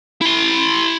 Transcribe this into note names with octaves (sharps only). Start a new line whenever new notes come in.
E4 C6